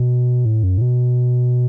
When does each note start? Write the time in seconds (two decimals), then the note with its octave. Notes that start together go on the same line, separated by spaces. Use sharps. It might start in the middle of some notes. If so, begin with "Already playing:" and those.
Already playing: B2
0.45 A2
0.63 F#2
0.78 A2
0.81 B2